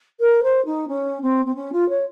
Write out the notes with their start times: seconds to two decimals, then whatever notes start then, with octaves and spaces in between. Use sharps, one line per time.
0.20 A#4
0.43 C5
0.65 D#4
0.88 C#4
1.22 C4
1.45 C4
1.55 C#4
1.72 F4
1.89 C#5